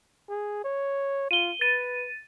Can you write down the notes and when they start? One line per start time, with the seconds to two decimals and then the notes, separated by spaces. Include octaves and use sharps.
0.29 G#4
0.64 C#5
1.31 F4 D#7 G7
1.61 B4 A6 D#7